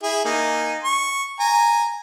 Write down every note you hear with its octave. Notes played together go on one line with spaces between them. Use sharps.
E4 G#4
A#3 D#4 G#5
C#6
G#5 A#5